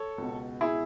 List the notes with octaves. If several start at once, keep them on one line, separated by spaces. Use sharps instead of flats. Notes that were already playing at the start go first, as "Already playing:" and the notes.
Already playing: A4 C#5
C#2 B2
E4 G#4